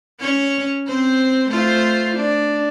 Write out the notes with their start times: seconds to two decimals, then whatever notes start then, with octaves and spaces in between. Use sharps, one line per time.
0.20 C#4 C#5
0.87 C4 C5
1.49 A3 F4 C5
2.17 D4